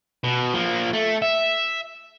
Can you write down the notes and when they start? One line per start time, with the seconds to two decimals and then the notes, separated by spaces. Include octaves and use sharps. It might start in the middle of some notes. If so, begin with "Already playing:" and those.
0.24 B2
0.54 F3 A#3
0.93 A3
1.22 E5